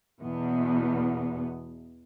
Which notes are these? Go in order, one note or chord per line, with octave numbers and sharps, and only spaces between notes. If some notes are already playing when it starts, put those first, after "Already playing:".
E2 B2 B3